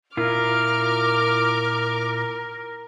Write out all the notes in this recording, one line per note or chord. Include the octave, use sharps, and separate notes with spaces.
A#2 E4 F4 A#4 D6 F6